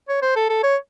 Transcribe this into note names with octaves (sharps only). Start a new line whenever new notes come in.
C#5
C5
A4
A4
C#5